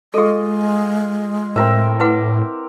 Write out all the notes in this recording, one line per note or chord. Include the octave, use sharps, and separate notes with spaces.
G#3 F4 G#4 A4 D#5
A2 C4 A#4 E5
E4 B4 F#5 D6